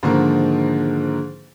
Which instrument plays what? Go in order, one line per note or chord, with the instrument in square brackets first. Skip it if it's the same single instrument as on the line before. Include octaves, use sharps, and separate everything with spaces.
[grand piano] G#2 D3 D#3 F3 A#3